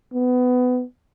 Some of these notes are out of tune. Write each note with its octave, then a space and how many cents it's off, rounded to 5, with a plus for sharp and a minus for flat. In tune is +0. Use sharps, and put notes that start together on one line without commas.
B3 +20